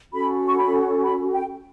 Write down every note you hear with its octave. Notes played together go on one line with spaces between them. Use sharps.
C#4 F#4 A4 B5
C#6
B5
B5
G5